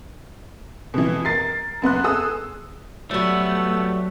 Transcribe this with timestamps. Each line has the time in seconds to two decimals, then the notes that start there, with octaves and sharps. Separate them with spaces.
0.94 B2 E3
1.25 A#4 A6 C7
1.82 F#2 B3 C6 F#6
2.04 G#4 A4 D#6 E6
3.11 F#3 G3 A3 B3 F#4 E6